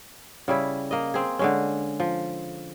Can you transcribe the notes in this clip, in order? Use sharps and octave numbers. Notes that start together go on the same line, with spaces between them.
C#3 G3 E4
A#3 D#5
C4 G#4
D3 G#3 C#4
F3